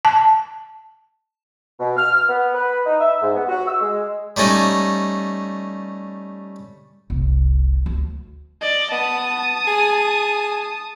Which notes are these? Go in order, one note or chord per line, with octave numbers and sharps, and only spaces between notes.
A5
B2
F6
F6
B3
B4
D#4
E5
G#2
B3
F#4
E6
G#3
G3 A3 C#4 D#4
F1 C2
D2
D5 D#5
B3 A5 D#6
G#4